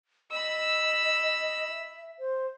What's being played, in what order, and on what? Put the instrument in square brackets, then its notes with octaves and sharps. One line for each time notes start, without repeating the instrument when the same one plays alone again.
[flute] D#5 [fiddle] B5 E6
[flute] E5
C5